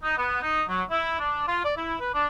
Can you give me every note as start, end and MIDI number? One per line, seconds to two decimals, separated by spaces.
0.03 0.15 63
0.17 0.38 59
0.42 0.63 63
0.68 0.83 54
0.91 1.17 64
1.19 1.44 62
1.48 1.61 65
1.64 1.74 74
1.77 1.94 64
2.00 2.10 71
2.14 2.27 62